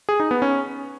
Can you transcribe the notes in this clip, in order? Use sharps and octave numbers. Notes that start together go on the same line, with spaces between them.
G#4
D#4
B3
C#4